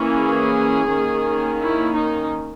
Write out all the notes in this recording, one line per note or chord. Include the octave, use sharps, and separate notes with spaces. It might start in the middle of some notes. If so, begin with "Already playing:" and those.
Already playing: E3 A#3 C#4
G#4
D#3 A#3 C#4
E4
D#4